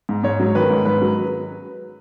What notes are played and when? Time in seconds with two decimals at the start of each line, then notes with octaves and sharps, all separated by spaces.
0.09 G#2
0.23 G#2 C#5
0.40 F#3
0.55 D#3 B4
0.70 G#2
0.85 G#2 B4
1.02 F#3